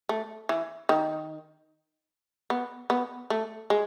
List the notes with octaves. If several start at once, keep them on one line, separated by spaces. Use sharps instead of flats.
A3
E3
D#3
B3
B3
A3
G#3